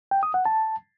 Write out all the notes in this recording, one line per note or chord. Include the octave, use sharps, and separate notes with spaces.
G5
D#6
F#5
A5